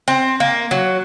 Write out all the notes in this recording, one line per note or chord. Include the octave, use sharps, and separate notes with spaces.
C4
A#3
F#3